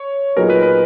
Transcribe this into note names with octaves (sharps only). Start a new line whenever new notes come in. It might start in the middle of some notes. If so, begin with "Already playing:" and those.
Already playing: C#5
A#2 F#3 B3 D#4 G#4 A#4
B4
B4